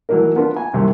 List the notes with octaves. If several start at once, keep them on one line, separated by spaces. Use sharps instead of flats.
E3 F#3 A3 A#3 D#4 A#4
B3 D4 F4 A#4
G#5
C2 F#2 C3 C4